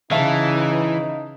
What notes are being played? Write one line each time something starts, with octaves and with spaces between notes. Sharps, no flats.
C#3 E3 D#4 E5 F5 A5